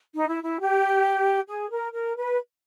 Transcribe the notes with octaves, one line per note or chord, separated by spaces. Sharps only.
D#4
E4
E4
G4
G#4
A#4
A#4
B4